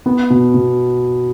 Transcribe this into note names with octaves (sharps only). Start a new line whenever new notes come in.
B3
B2
B2